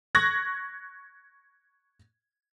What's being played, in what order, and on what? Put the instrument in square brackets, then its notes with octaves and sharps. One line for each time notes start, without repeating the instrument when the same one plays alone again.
[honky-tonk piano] C#6 F#6 G#6 A#6